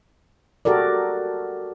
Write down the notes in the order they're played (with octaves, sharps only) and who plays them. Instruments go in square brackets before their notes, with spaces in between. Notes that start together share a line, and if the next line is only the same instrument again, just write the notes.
[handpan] F#4 G4 A4 A#4 D5